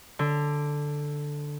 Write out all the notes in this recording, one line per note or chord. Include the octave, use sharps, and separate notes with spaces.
D3